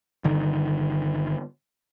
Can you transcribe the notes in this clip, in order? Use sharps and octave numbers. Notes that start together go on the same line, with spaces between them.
G1 D3 D#3